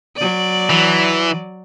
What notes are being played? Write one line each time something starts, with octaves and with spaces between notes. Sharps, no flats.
F#3 D5
E3